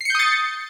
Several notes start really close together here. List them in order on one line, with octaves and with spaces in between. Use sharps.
C7 C#7 G6 D#6 A6